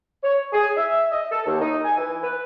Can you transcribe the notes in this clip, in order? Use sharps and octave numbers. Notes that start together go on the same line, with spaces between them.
C#5
G#4
E5
D#5
A4
D#2
D#4
G#5
E3
B4